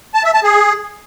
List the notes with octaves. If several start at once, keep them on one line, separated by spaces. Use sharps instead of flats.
A5
E5
A5
G#4